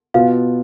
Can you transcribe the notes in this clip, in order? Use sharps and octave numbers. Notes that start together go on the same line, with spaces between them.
B2 B3 F4 F5